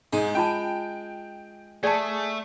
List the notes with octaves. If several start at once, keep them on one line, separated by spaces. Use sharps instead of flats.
G#2 G#3
C#4 F4 G5 A5
A3 G#4 D5 A5